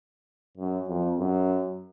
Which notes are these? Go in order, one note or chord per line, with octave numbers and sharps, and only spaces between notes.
F#2
F2
F#2